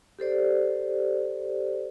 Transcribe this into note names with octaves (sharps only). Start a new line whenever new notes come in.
G4 A4 C5 D5